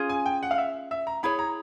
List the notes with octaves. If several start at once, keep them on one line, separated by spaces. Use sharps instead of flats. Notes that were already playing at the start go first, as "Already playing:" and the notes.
Already playing: C#4 F4 G#4
G#5
G5
F#5
F5
E5
E5
A#5
E4 G#4 C#5 B5
A#5